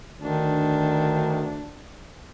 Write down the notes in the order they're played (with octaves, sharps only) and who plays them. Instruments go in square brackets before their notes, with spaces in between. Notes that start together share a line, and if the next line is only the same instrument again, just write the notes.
[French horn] D2 [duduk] D#3 [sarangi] D4